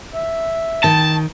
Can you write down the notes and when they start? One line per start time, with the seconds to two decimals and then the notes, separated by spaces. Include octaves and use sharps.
0.14 E5
0.84 D#3 A5